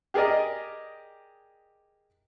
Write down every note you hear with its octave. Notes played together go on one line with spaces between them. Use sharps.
G4 G#4 A#4 D5 D#5